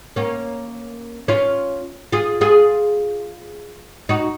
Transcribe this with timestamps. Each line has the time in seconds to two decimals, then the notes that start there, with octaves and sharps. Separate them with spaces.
0.16 A#3 C#4
1.28 C#4 F4
2.12 F4 G#4
2.41 F4 G#4
4.09 D#4 F#4